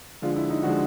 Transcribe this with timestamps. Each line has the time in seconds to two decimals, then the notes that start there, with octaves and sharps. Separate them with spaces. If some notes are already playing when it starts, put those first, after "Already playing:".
0.22 D3 F3 G#3 F4
0.36 E4
0.50 D#4
0.63 D3 F3 G#3 F#4